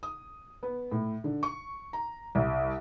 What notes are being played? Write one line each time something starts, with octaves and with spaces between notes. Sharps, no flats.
D#6
B3
A2
D3
C#6
A#5
C2